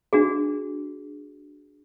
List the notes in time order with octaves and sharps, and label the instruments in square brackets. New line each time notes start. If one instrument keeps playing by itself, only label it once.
[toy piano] D4 F#4 G#4